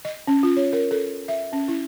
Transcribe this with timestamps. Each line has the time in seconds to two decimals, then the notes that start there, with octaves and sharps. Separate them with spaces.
0.05 D#5
0.27 C#4
0.43 F4
0.57 C#5
0.73 A#4
0.91 A4
1.28 E5
1.53 C#4
1.68 E4